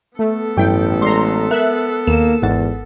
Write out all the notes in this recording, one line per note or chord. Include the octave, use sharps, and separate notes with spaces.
A3 B3 A4
A1 G2 F#3 E4 G5
G#3 D5 A#5 C6
A#4 E5 F#6
D#2 A#3 A#4 E7
G#1 E2 G#2 F#5 A6